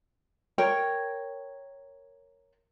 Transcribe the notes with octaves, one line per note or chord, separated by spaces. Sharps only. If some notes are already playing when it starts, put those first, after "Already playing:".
A#4 C#5 G5